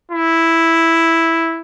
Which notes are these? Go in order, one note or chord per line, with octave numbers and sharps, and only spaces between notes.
E4